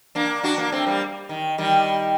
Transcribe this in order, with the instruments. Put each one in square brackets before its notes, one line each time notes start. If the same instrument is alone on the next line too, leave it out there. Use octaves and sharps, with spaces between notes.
[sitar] A#3 D4
D4 F#4
A#3 D4
A3 C4
G3 A#3
D#3
D#3 G3